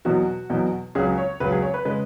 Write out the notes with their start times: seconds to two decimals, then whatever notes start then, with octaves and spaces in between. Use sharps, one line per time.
0.05 E2 B2 F#3 F#4
0.50 E2 B2 F#3
0.95 C#2 C#3 F#3 G#4
1.18 C#5
1.40 C#2 C#3 F#3 B4
1.52 G#4
1.62 C#5
1.74 B4
1.85 C#3 G#3 B4